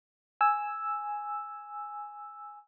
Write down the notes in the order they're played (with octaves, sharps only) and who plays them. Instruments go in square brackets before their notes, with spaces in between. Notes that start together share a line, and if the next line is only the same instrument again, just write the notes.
[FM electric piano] G#5 E6